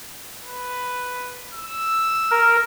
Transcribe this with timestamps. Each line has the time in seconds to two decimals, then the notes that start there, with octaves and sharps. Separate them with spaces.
0.43 B4
1.54 E6
2.31 A#4